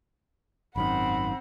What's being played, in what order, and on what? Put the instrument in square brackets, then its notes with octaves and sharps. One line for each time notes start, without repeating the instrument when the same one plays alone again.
[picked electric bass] G#1 F#2 D#3 [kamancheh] C4 F#5 [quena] B5